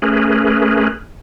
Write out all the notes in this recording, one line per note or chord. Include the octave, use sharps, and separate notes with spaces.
A3 C#4 G#4 A#4 B4